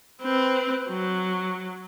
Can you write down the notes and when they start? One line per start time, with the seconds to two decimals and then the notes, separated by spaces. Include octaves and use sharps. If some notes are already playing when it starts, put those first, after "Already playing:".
0.22 C4 B4
0.89 F#3